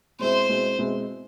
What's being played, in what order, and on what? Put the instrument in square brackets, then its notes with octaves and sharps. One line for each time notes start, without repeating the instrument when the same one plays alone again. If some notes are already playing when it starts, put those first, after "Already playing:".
[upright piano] B2 G#3 C4 E4 [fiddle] C5
[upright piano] B2 G#3 C4 E4
B2 G#3 C4 E4